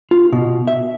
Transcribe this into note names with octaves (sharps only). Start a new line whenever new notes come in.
F4
B2
E5